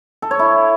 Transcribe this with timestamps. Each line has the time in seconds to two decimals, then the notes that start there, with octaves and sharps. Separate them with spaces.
0.22 A4
0.31 C#5
0.39 E4